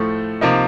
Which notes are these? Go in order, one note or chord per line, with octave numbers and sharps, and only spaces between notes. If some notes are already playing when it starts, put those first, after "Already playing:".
Already playing: A2 F3 A3
C3 F3 A#3 D#4